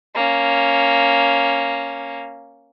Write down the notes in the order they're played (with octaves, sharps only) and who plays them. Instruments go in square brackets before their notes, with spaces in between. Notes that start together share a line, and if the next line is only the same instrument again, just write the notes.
[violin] A#3 C#4